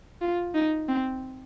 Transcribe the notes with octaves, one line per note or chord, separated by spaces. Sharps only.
F4
D#4
C4